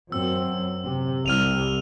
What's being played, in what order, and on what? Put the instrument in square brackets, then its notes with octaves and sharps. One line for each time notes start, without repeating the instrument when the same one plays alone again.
[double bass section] F#2 C4 [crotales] E6
[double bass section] C3
[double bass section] C2 [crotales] F6 D#7 F7